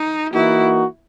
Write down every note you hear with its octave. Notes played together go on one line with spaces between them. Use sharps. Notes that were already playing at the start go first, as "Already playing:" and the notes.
Already playing: D#4
E3 A#3 D#4 E4 F#4